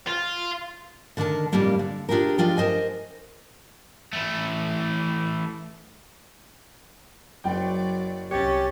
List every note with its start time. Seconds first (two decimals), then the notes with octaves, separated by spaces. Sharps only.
0.08 F4
1.17 D3 D#3 D4 A#4 A5
1.52 F2 A2 F3 G3 A#3 D4
1.79 D3
2.09 D4 F4 G4 G#4 A#4
2.38 F3 G#3 D4 F4 G5
2.57 A#4 C5 D#5 G#5
4.13 E3 A3
7.44 F#1 F#3 D5 G5
8.31 C2 C#4 G4 C#5 A6